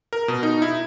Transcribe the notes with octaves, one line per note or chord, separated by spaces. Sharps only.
A#4
B2
D#4
E4